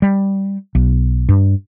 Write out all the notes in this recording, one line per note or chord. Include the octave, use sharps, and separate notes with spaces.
G3
B1
G2